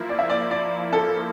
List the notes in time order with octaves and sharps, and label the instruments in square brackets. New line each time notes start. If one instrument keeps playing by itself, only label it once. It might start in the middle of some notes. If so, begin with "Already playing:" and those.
Already playing: [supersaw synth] F3 A#3 E4
[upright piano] D5
E5
D5
D5
A4